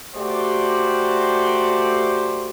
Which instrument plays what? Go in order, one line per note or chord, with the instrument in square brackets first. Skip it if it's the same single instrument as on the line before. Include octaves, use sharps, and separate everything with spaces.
[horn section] A3 F#4 G4 C5 D5